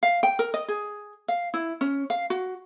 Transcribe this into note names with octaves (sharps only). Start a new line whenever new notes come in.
F5
G5
A#4
D#5
G#4
F5
E4
C#4
F5
F#4